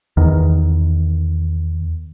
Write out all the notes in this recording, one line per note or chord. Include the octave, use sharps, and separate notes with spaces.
E2 D#3